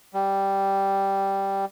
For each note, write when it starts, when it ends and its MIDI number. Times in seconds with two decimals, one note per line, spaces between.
0.14 1.65 55